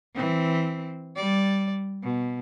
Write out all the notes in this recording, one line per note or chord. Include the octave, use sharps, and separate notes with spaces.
E3 C4
G3 D5
B2